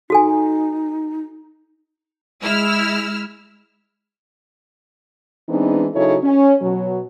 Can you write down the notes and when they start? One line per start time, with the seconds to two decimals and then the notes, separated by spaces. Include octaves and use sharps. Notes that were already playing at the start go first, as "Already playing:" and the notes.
0.10 D#4 F#4 A4 G#5
2.43 G#3 E4 E6 F6
5.49 E3 G#3 B3 C4 D4 D#4
5.95 C#3 F#3 D#4 E4 A4 C#5
6.23 C#4
6.62 B2 F#3